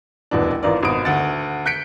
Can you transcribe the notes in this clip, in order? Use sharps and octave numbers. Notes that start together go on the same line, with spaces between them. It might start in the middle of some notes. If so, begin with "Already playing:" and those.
D#1 A1 E2 B2 D4
G#1 E3 F4 A#4 D5
G#1 B2 B3 D#6 D7
D2 F#5 A6
F#6 G6 B6 C#7 D7